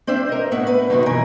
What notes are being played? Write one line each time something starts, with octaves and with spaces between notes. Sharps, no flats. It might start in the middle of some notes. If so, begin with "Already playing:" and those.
C4 D4 C5 E5
A#4 D#5
A2 B3 E5 F#5
B4
F#2 B2 D#3 F#4
B2 E3 A#4 G#5